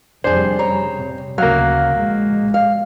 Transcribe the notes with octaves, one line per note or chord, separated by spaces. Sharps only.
F1 F2 G3 D4 G#4 C5
C#3 C#5 A#5
C3
D2 C#3 F#3 A#3 F5
A#1 G#3
F5